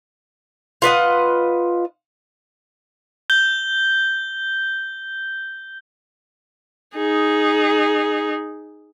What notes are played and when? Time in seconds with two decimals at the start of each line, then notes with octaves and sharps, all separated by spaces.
0.82 F4 B4 D#5 F#5
3.30 G6 G7
6.95 D#4 G#4